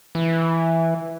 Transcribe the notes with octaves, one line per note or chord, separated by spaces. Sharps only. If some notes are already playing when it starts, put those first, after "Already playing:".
E3